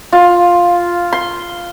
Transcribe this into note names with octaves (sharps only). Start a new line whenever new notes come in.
F4
C6